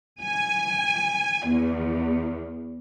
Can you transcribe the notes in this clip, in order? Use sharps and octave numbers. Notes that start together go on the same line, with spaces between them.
G#5
E2